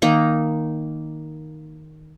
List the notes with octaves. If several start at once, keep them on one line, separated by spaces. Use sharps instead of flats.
D#3 A#3 D#4 A#5